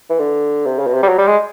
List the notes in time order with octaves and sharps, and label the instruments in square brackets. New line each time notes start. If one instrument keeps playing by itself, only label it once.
[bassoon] E3
D3
C3
C#3
B2
C3
G3
F#3
G3
G#3